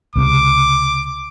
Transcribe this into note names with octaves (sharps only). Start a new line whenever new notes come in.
C#2 C3 D6